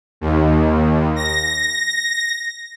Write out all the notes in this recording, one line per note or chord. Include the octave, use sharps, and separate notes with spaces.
D#2
A#6